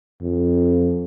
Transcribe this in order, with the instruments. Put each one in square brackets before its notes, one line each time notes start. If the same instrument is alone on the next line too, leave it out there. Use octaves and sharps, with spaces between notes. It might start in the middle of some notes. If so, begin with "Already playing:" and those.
[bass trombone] F2